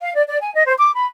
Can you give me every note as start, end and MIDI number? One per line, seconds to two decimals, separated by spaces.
0.01 0.15 77
0.15 0.22 74
0.27 0.37 74
0.41 0.52 80
0.54 0.63 75
0.66 0.74 72
0.78 0.91 86
0.94 1.06 83